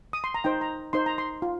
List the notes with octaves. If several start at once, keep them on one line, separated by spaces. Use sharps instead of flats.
D#6
C6
A#5
D#4 C5 G5
A#5
D#4 C5 C6
A#5
C6
F4